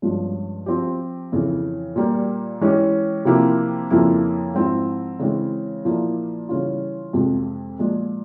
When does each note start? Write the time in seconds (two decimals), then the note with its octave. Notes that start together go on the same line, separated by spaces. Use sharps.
0.02 G2 F3 G#3 C#4
0.66 F3 C4 G4
1.32 F2 C#3 E3
1.96 A#2 G3 A#3
2.61 E3 G#3 C#4 G4
3.25 C3 F3 A#3 E4 G4
3.91 F2 C#3 F3 A#3 E4
4.55 G#2 F3 C4 E4
5.19 C#3 E3 G#3 C4
5.85 A#2 F3 A#3 E4
6.49 C#3 E3 G3 C#4 F4
7.13 F2 C3 F3 G#3
7.79 A#2 F3 G#3